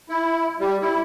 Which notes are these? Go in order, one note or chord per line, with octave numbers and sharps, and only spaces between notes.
E4
G3
E4